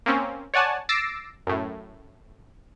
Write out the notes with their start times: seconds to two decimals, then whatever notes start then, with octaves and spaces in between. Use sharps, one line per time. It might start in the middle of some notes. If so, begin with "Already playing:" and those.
0.06 A#3 C4 C#4
0.54 C#5 D5 F#5 G#5 A5
0.89 D6 E6 A6 A#6 C7 D7
1.47 F#2 A2